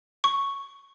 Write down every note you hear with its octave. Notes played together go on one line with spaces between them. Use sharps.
C#6